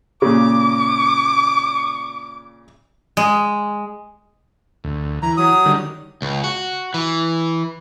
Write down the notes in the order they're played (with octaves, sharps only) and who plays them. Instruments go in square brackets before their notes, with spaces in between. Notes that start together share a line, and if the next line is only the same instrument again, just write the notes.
[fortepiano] A#2 C#3 [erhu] D6
[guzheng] G#3
[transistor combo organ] D2
[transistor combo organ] E3 [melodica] A#5
[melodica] F#3 D#6
[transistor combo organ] D3 D#3 G3
[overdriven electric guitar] C#2
F#4
E3